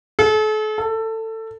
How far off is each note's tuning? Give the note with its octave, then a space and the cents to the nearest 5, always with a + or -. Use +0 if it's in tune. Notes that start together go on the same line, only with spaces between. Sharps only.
A4 -40
A4 +20